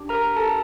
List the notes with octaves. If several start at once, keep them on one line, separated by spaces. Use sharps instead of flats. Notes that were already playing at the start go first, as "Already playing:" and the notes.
Already playing: D4 G4
A#4 A#5
A4 A5